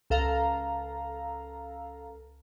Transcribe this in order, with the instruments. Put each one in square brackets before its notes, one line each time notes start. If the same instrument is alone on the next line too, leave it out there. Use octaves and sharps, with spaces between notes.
[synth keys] C#2 A4 F5 A#5